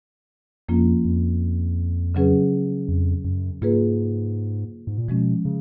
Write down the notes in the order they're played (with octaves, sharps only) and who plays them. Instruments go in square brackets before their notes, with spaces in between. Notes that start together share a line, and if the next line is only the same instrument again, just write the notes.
[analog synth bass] F2 [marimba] F3 A#3 C#4 F4
[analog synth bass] F2
[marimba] C#3 F#3 C#4 G#4 B4
[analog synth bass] F2
F#2
[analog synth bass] G#2 [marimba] A#3 F4 G#4 B4
[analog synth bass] G#2
A#2
[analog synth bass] B2 [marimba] F3 G#3 C#4
[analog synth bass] C#3